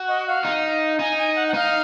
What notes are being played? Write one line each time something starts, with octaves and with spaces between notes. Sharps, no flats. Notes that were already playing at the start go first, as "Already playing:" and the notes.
Already playing: F#4
D#5
F5
D#4
D#4 G#5
G#5
F#5
F#5
D#4 F5